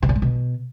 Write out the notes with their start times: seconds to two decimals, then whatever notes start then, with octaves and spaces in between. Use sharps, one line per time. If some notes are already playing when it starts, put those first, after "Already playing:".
0.03 C3
0.09 A#2
0.16 A2
0.22 B2